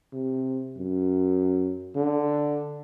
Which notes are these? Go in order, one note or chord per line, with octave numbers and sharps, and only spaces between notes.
C3
F#2
D3